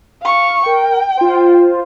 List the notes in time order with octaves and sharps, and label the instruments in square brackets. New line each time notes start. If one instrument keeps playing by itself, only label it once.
[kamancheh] F5 C#6
[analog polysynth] A#4 [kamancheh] G5
[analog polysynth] F4 C5